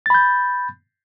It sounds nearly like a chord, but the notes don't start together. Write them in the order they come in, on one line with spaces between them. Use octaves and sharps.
A6 B5 G6